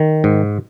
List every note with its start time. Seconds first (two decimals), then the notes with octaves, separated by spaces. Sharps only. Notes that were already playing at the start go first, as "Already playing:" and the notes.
Already playing: D#3
0.24 G#2